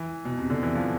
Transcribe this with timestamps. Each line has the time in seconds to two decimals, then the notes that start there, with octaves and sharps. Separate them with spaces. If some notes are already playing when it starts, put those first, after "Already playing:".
Already playing: E3
0.25 B2
0.38 C3
0.50 D3
0.63 E3
0.75 F3